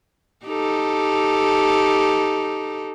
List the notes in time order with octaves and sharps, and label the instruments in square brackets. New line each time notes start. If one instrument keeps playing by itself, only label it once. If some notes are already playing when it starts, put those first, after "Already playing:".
[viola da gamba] D#4 G4 A4